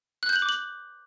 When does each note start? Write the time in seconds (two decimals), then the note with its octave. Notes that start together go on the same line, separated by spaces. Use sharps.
0.23 F#6
0.29 G6
0.36 F#7
0.42 D6
0.49 F#7